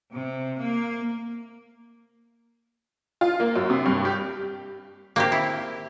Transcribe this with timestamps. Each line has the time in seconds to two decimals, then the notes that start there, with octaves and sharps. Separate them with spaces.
0.13 C3
0.60 A#3
3.21 F4
3.40 A#3
3.56 F#2
3.70 C3
3.86 G2
4.05 G4
5.16 A#3 C4 G4
5.32 E4